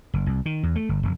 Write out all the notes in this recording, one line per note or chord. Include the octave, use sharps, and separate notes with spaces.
F#1
C2
D#3
E2
A3
G1
F1